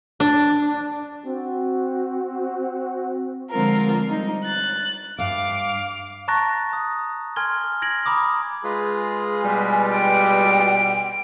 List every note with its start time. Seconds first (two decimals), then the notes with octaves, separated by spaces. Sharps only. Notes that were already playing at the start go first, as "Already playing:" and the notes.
0.20 D4
1.26 C4 F#4
3.50 D3 F3 G#3 C4 F4 A#4
4.08 G3 D#4
4.44 F#6 A6
5.19 G2 E5 F5 D6
6.28 A5 A#5 C#6 F#6 A6 A#6
6.73 D#6
7.36 G#5 C6 F6 G#6 G7
7.82 G#6 A#6 D7 F#7
8.06 A#5 B5 D6 D#6
8.64 G#3 F4 G#4 B4
9.43 B2 G3 G#5
9.94 G5 D7